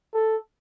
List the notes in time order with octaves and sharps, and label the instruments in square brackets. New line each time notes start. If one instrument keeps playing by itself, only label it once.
[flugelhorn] A4